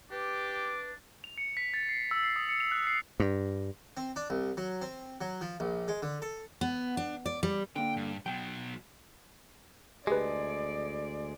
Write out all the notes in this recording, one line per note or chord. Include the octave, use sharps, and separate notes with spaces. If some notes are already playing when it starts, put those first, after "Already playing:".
D4 G4 B4 D6
F7
C#7
B6
A6
C7
E6
C7
D#6
C#7
F7
F#6
C7
G2
C4
D4
C2
F#3
C4
F#3
F3
A#1
G#3
D3
A4
B3
D4
D5
G3
D3 A#3 G5
G2
B2 F#3 G5
D2 G#3 G4 G#4 B4 D5